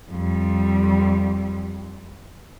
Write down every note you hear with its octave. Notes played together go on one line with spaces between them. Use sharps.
F2 G3